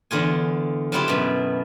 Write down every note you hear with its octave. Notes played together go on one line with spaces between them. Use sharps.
E2 D3 F4 G#5
F3 F#3 C4 E4 F4 G4
F#2 B2